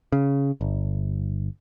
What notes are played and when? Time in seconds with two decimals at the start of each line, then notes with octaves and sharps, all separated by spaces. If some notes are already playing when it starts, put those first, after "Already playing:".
0.12 C#3
0.61 G1